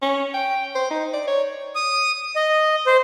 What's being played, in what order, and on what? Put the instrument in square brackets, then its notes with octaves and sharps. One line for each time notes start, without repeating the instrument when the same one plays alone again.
[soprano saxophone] C#4
G5
C5
D#4
D5
C#5
[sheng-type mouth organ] D#6
D#5
C5